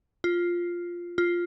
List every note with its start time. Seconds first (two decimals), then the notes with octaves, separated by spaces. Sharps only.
0.24 F4
1.18 F4